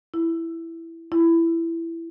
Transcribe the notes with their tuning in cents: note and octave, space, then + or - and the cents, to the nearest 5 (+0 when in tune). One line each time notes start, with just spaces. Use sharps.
E4 +5
E4 +15